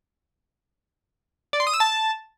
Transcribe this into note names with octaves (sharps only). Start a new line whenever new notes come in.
D5
C6
D#6
E6
A5